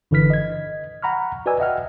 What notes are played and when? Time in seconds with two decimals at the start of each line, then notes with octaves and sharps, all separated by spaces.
0.11 G1 D3 E3 B4 F6 B6
0.30 D#5 G#6
1.02 F#5 A#5 B5 C#6 F6
1.46 F#4 B4 D5 D#5 G#5 E6
1.60 D#5 E5 F#5 G5 F6